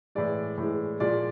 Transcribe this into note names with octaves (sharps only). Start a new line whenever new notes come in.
A2 E3 G#3 D5
A2 E3 G#3
A#2 F3 G#3 D5